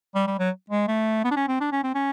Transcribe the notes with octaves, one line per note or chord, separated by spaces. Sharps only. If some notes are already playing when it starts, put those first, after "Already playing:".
G3
G3
F#3
G#3
A3
B3
D4
C#4
C4
D4
C#4
C4
C#4